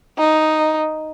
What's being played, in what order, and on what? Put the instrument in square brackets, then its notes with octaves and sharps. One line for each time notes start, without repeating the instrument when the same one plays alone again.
[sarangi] D#4